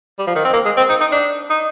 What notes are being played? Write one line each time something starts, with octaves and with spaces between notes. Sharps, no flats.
G3
F3
D#3
C4
A#3
G#3
C4
D#4
D#4
D4
D#4